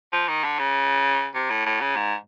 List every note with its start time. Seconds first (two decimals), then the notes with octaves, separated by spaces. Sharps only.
0.13 F3
0.28 D#3
0.44 D3
0.59 C#3
1.35 C3
1.50 A2
1.66 A2
1.81 C#3
1.96 G#2